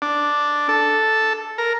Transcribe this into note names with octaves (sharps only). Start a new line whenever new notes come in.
D4
A4
A#4